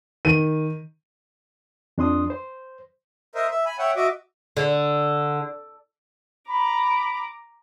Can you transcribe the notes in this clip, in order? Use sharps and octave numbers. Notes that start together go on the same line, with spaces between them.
D#3 D#7
F2 D4 C6 D#6
C5
A#4 C5 D#5 E5
E5
G#5 B5
C#5 E5 F#5 G5
F#4 D#5 E5 D6
D3
A#5 B5 D6